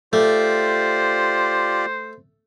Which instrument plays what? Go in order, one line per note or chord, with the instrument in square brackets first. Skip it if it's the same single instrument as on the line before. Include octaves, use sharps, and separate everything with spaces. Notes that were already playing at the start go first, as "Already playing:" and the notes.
[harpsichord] A3 [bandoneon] F4 G4 D5 [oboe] C5